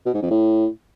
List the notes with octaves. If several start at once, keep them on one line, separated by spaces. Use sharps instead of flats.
B2
G#2
F2
A2